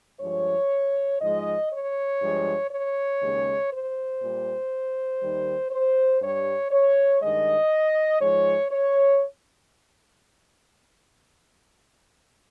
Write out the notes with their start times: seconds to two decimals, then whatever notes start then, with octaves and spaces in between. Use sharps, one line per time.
0.21 G2 F3 G#3 C#5
1.21 G#2 F3 G#3 D#5
1.71 C#5
2.21 G2 F3 G#3
2.71 C#5
3.21 D#2 C#3 G#3
3.71 C5
4.21 A#2 G3
5.21 D#2 D#3 G3
5.71 C5
6.21 G2 G3 C#5
6.71 C#5
7.21 G2 D#3 G#3 D#5
8.21 G#2 F3 G#3 C#5
8.71 C#5